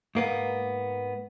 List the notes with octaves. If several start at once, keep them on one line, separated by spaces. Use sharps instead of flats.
G#2 A#3 B3